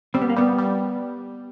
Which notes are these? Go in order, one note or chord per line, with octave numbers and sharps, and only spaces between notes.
G3 C4
B3
A#3
G3 B3
G3